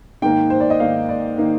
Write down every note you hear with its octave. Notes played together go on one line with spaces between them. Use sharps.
G#2 D#3 A#3 D#4 G5
C5
D5
D#5
G#2 D#3 A#3 D#4 F5
D5
D#3 A#3 D#4